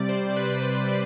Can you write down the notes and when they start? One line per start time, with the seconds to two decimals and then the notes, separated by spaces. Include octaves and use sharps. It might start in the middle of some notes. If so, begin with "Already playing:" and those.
Already playing: C3 G3 D5
0.09 C5
0.36 B4